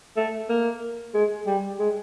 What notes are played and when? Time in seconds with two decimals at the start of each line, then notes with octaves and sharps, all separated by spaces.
0.17 A3
0.49 A#3
1.14 G#3
1.47 G3
1.79 G#3